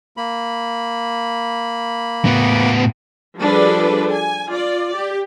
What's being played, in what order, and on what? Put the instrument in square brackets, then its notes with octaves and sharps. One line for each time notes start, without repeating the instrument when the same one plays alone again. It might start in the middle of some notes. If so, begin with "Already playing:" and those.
[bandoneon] A#3 B5
[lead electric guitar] A2 B3
[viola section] F3 G3 D4 G#4 A4 B4
G#5
F4 D5
G4